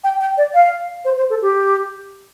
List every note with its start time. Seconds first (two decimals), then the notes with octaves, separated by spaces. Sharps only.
0.04 G5
0.21 G5
0.37 D5
0.54 F5
1.05 C5
1.17 C5
1.30 A4
1.42 G4